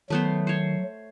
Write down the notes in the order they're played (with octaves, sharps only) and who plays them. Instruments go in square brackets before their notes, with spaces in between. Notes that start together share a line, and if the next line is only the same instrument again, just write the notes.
[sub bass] D#3 [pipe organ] F#3 [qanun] A3 B3 C5
[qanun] C5 C#5